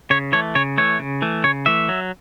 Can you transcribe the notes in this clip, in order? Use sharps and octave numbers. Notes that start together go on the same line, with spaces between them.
C#3 C#5
E3 A3 C#5
C#3 C#5
E3 A3 C#5
C#3
E3 A3
C#3 C#5
E3 A3 E5
F#3